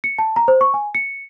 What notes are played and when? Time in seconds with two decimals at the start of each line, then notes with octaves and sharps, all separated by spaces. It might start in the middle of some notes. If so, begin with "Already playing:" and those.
0.04 C#7
0.19 A5
0.36 A#5
0.48 C5
0.61 C#6
0.74 G#5
0.95 C#7